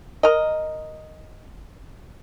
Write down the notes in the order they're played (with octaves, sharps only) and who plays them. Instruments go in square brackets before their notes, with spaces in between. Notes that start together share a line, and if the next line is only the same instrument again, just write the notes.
[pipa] A#4 D#5